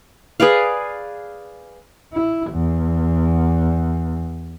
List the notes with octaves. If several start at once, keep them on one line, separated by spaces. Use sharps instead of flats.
G#4 B4 D5 F5
E4
E2